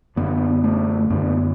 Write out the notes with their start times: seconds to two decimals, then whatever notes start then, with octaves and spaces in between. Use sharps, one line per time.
0.16 F#2 D3 B3
0.64 A3
1.10 F#2 D3 B3